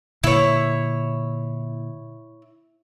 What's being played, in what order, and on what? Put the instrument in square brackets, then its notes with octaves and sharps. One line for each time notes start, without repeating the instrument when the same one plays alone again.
[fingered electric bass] A#2 D3 A#3 [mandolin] E4 C#5